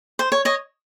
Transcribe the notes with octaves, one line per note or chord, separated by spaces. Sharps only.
C5
C#5
C#5 D#5